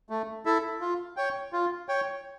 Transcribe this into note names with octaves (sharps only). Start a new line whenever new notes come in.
A3
E4 A4 E5
F4
C#5 G5
F4
C#5 G5